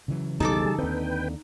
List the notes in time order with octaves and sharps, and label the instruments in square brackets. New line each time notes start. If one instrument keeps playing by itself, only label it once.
[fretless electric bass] C#3 E3 F#3
[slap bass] B1 F2 [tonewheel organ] G3 G#4 A5 [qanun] D#4 A4 D6
[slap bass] D#2 D3 [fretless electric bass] C4 [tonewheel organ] B4 G5